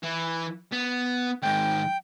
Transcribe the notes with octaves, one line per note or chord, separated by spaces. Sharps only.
E3
B3
G#2 D#3 G5